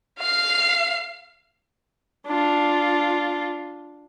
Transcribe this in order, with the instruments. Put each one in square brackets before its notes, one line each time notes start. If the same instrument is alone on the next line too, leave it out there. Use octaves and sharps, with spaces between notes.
[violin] F5 C7
[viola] D4 F4